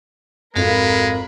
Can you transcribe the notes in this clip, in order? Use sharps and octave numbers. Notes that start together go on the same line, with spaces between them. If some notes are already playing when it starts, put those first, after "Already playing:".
G#1 F2 G#3 F#4 A4 A#4 F5 B5